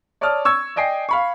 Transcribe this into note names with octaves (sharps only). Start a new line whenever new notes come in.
C#5 D5 A5 D#6 F6
C#6 E6 G#6
D5 D#5 G5 G#5 C7
F5 B5 C#6